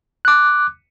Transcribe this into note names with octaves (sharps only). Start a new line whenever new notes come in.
D6 F#6